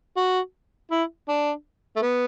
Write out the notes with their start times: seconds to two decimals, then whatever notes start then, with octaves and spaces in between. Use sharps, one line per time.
0.17 F#4
0.91 E4
1.29 D4
1.96 A3
2.02 B3